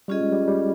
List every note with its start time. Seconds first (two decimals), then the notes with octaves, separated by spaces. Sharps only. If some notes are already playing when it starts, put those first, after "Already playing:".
0.08 G3 C#4 F4 G#4 D#5
0.21 G#3
0.32 G3
0.47 G3